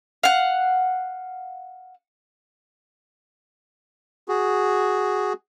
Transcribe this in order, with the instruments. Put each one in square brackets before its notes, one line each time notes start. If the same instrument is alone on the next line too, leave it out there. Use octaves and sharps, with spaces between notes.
[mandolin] F5 F#5
[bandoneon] F#4 G#4